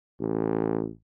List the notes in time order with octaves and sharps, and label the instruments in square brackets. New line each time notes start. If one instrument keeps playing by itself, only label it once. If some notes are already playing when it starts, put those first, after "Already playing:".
[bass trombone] A1